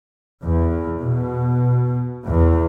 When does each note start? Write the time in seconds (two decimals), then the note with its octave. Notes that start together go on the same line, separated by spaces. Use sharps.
0.44 E2
1.04 B2
2.25 E2